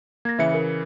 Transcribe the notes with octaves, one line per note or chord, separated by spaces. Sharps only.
A#3 G#6 A#6
C#3 E3 E5 C#7
A#4